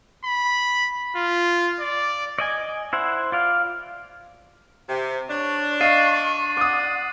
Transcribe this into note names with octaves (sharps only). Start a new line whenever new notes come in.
B5
F4
D5
D5 D#5 G#5
E4 C5 F#5
F4 D5 F5
C3
D4 C#5
D#5 F5 C#6 A6 C7 D#7
F#5 D6 D#6